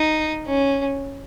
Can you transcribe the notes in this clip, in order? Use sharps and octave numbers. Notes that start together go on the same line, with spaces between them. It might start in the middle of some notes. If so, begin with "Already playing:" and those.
Already playing: D#4
C#4